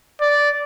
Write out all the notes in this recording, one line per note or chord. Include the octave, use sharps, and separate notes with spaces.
D5